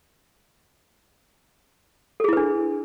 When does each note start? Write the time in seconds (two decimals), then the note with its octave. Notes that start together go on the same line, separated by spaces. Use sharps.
2.20 A4
2.24 G#4
2.28 E4
2.33 B4
2.37 D4